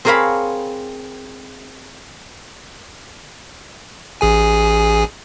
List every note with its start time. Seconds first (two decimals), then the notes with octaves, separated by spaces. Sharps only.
0.05 C4 G#4 A#4 C#5 F5 B5
4.21 A1 G#4 G#5